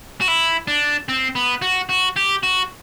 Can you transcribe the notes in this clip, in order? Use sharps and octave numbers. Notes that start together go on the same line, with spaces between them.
F#4
E4
D4
C4
B3
F#4
F#4
G4
F#4